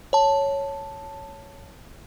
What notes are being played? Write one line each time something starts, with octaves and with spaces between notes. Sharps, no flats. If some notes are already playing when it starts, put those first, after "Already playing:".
C#5 A5